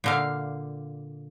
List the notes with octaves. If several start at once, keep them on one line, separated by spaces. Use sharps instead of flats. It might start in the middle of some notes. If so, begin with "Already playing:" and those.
A#2 D3 F5